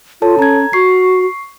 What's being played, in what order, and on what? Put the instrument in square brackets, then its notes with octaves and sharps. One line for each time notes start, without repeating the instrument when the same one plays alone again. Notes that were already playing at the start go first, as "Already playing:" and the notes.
[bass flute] F4 [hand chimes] A4 C#5 A5
[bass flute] C#4 [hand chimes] A#5 G#6
[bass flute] F#4 [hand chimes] C#6 C7